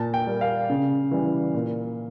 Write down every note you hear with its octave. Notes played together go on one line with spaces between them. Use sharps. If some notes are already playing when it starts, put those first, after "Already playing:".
Already playing: A#2 A5
G5
G3 A#3
F5
C#3
E3 G3
A#2